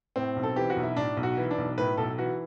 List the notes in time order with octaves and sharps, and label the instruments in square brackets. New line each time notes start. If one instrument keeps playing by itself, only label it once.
[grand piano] A2 C4
B1
A4
E3 G4
F#4
B1
E4
A2 D4
B1
F#4
E3
D4
B1
A2 B4
B1 A4
E3 F#4